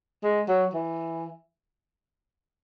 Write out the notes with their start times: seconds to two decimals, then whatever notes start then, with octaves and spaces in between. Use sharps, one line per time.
0.24 G#3
0.48 F#3
0.74 E3